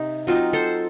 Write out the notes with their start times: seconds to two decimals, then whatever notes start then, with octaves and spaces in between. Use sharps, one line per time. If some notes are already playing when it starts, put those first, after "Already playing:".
Already playing: C3 D#4
0.27 F#3 C4 D#4 F4
0.53 A4 C5